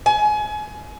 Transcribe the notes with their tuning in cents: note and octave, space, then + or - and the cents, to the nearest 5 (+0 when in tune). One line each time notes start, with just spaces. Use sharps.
G#5 +30